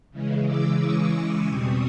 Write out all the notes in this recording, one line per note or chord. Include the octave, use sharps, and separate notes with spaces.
C#3 E3 G#3
D6 E6
C#6 D#6
D6 E6
E2 B2 G3 C4 C#6 D#6